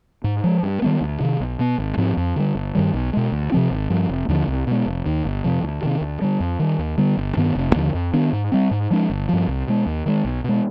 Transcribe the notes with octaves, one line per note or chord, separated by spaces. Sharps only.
G#2
F3 G#3
G2
D#3 G3 B3
D2
C3 D#3
B1
B2 B3
G#1
G#2 F3 C4
F2
D3 G3
G1
G2 D#3 G3
B1
B2 G#3
D2
C3 F3 C4
G#1
G2 F3
F1
D#2 D3 F3
C2
B2 G#3
F1
D#2 D#3
G1
F2 C3 F3
D2
C3 D#3
D2
D3 G3
F2
D#3 G3
D#2
D3 G3 B3
G1
G2 D#3 B3
F1
D#2 D3 F3
F2
D#3 B3 D4
G#2
G3 C4
G#2
F3 G#3 D4
G1
G2 F3
C2
B2 G#3
D#2
D#3 G#3
B1
B2 G#3